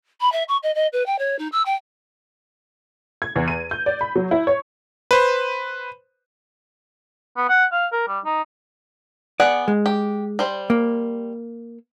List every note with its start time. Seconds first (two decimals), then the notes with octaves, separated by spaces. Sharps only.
0.21 B5
0.32 E5
0.48 C#6
0.63 D#5
0.75 D#5
0.92 B4
1.06 G5
1.18 C#5
1.39 D#4
1.52 E6
1.65 G5
3.22 G#6
3.36 E2
3.48 D#7
3.71 G6
3.86 D5
4.01 B5
4.16 F#3
4.31 E4
4.47 C#5
5.11 B4 C5
7.37 B3
7.49 F#5
7.72 F5
7.92 A#4
8.08 G3
8.25 D#4
9.40 B3 G#4 D5 F#5
9.68 G#3
9.86 G4
10.39 G3 C5
10.70 A#3